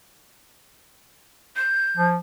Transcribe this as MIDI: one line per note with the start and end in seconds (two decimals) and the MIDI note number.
1.56 2.07 91
1.97 2.17 53